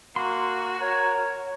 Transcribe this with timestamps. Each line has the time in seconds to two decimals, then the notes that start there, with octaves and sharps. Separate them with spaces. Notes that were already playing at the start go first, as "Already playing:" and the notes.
0.16 A#3 F#4 C6 F#6
0.80 A#4 C#5